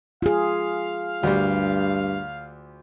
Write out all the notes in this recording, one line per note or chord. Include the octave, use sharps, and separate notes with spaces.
F4 G#4 F5
D2 G2 G3